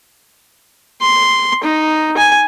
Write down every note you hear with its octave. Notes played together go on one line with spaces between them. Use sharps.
C6
D#4
G#5